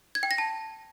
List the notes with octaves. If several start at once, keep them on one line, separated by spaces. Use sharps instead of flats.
G#6
G5
A#6
A5